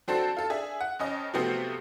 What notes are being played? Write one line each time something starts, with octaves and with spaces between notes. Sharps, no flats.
F#3 C4 D4 F#4 A4 C5
F4 A4
D4 G#4 E5
F#5
F2 C#4 D#5
C3 F3 F#3 A3 B3 C4